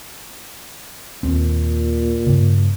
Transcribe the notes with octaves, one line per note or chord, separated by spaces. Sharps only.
D#2 A#2 C4
G2 C#3